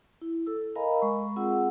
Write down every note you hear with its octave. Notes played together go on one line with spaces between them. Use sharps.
E4
A4 E6
A#4 D#5 F5 G#5 A#5 B5
G#3 B5 C#6
C4 F4 G#4 F#5 E6